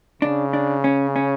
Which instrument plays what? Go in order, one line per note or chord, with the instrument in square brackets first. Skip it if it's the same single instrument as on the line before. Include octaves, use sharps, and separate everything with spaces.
[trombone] C#3 [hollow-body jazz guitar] D4
[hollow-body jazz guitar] D4
C#4
C#4